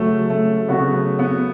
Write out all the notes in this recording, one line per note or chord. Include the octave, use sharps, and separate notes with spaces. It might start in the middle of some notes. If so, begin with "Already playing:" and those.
Already playing: C#3 F#3 A3 C#4 F#4
A3
C#3 F#3 B3 C#4 F#4
B3